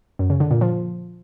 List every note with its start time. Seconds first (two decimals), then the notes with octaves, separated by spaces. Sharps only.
0.19 F#2
0.30 C#3
0.40 D3
0.51 A#2
0.61 F3